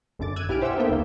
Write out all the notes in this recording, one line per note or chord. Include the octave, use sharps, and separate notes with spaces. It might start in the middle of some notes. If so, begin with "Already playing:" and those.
G#1 F#2 D3 D6 A6
E6 F#6 G#6 D#7
B1 E4 G4 G#5 F6 D7
G4 C5 E5 F#5 G5 E6
A#3 B3 D#4 A4 E5 G5
G1 C#2 A#3